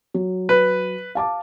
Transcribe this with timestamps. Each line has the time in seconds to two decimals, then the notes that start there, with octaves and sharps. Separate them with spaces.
0.14 F#3
0.49 B4
1.15 F5 A5 D6